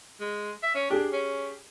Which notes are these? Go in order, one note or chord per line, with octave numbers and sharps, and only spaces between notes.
G#3
E5
C#4
D4 G4 G#4
C#4